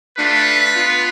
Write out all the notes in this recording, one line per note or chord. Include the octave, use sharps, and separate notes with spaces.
A3 D4 F4 B4
B3 F4